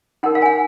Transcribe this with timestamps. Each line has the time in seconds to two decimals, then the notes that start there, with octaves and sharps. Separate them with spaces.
0.23 D#4 A#4 F#5
0.35 F5
0.42 G#5
0.46 F#5